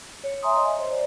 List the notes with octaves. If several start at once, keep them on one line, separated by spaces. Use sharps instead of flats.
C#5
E5 G#5 A#5 C6 D#6
D#5
C5
D5